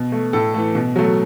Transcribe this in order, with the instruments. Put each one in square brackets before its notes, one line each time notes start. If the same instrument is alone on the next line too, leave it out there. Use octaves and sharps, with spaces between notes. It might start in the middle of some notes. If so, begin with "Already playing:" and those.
Already playing: [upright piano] B2
A3
A2 A4
E3 A3
B2
F#3 A3